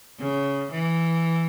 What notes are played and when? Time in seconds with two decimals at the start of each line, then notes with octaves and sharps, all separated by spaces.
0.19 C#3
0.72 E3